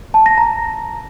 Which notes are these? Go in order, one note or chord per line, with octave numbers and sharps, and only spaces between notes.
A5
A#6
A#5